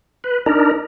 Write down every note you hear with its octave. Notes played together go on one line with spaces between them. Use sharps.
B4
D4 D#4 A#4